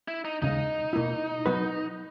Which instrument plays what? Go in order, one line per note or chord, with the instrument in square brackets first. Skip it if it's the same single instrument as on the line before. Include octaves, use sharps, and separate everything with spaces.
[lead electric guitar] E4
D#4
[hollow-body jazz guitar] D#2 C#3 G#3 [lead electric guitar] D#4
[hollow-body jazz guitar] B2 A#3 E4
F#3 B3 F#4 B4